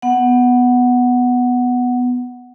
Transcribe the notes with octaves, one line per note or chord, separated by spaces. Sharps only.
B3 F#5